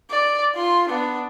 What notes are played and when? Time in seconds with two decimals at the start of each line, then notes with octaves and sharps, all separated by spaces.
0.11 D5
0.55 F4 C6
0.88 B3 D4